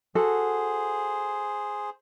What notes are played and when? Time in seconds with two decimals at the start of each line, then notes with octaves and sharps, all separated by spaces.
0.15 F#4 G#4 A4 C5